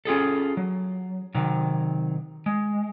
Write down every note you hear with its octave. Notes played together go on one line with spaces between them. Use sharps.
C#4 F4 G#4 A4
F#3
C3 D#3 F#3
G#3